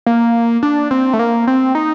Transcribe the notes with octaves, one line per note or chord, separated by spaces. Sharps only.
A#3
D4
C4
A3
A#3
C4
D#4